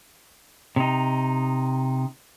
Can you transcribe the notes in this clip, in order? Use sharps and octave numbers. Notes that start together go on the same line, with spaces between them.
C3 D#4